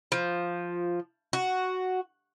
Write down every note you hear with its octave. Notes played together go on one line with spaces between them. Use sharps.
F3
F#4